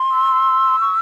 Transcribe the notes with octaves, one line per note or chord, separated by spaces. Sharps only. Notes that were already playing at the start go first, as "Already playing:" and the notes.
Already playing: C6
E6
C#6